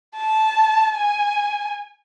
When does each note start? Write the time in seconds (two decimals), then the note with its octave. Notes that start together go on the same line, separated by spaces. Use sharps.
0.16 A5
0.96 G#5